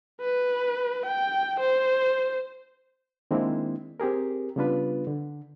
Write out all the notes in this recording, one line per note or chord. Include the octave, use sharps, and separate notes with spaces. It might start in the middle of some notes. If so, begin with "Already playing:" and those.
B4
G5
C5
D#3 G#3 A#3 C4 D4 E4
C4 G4 G#4 A#4
C#3 G3 B3 D4 F4 B4
D3